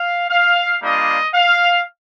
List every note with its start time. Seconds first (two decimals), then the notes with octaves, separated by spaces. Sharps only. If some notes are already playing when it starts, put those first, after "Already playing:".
Already playing: F5
0.30 F5
0.82 G3 A#3 D4 F4 D#5
1.35 F5